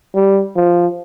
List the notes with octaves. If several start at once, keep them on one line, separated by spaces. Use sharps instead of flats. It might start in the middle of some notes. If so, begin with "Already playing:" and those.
G3
F3